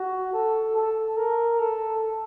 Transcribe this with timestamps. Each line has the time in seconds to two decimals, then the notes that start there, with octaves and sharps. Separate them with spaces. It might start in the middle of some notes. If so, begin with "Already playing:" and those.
Already playing: F#4
0.33 A4
0.76 A4
1.17 A#4
1.59 A4